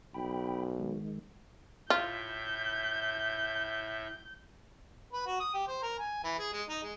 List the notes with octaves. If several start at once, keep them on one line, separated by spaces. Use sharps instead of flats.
B1 G5 B5
D#3 G#3
A2 F4 E5 G6
B4
F#4
D#6
G4
C5
A#4
G#5
E3
G#4
G#3
D#4
G#3